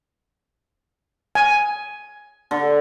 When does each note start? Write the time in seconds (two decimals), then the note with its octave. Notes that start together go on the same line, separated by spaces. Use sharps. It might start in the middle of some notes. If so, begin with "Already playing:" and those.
1.35 G#5
2.51 D3